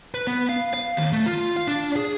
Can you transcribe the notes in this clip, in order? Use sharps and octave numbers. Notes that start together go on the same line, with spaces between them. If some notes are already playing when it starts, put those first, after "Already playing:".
B4
B3
F5
F5
D#2
A3
F4
F5
D4
G#4